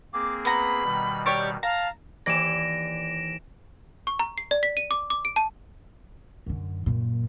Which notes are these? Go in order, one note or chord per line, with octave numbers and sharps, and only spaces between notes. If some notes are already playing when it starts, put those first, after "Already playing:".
A#3 C4 G#4 D6
B3 A#5 B5
B2 D#3 G3
G4 C#5 D5
F5 A5 A#5
D#2 E3 D5 A#6 D7 E7
C#6
A#5
C7
D5
B6
D#7
D6
D6
D7
A5
F#2 D3
F#2 A#2